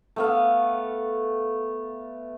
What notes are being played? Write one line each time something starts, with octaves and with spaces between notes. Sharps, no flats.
A3 B3 F5